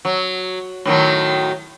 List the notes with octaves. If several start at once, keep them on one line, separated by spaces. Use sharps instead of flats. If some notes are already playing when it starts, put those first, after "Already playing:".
F#3
A2 D#3 F#3